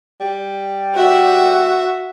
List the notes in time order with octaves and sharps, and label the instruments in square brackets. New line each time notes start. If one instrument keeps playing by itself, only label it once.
[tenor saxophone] G3
[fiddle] F#4 E5